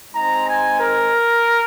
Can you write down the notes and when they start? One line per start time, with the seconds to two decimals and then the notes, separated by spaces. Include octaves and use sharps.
0.14 G#3 C4 D#4 A#5
0.46 G#5
0.78 A#4